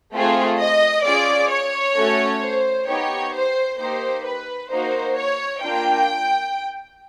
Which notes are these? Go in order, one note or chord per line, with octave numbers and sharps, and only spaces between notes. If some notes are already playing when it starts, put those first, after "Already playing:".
A3 C4 F4 G#4
D#5
C#4 F4 G#4 D5
C#5
A3 C#4 F#4 A4
C5
B3 D#4 G4 C#5
C5
A#3 D#4 G4 C5
B4
A#3 D#4 F#4 C5
C#5
A#3 D4 F4 G5